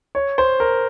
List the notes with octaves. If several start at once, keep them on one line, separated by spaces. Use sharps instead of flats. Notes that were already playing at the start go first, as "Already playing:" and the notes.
C#5
C5
A#4